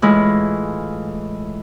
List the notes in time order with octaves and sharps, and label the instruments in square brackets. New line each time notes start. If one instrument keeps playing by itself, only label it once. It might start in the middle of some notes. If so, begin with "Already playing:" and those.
[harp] A2 E3 G#3 E4 F4